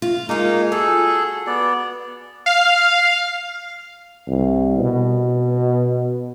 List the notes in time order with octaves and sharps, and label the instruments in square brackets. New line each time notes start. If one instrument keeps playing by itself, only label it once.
[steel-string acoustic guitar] F4
[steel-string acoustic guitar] G#3 F4 [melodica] A#3 D#4
[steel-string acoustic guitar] F#4 [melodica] G#4 A4
[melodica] B3 D5
[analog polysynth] F5
[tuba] C2
B2